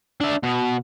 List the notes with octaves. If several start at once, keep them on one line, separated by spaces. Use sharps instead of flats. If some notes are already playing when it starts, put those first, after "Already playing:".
D4 E5
B2